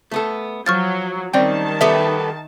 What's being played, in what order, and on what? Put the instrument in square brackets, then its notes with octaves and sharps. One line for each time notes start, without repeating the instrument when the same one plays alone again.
[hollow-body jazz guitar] A3 B3 A4
[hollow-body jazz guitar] F3 [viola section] F#3 [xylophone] C#6 F6 A6
[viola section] D#3 A5 [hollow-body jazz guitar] G3 C4 C#4 [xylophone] D5 G5
[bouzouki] A3 B3 G4 [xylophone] E5